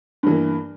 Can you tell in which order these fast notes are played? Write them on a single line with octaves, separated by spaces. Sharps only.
G2 E3 A#3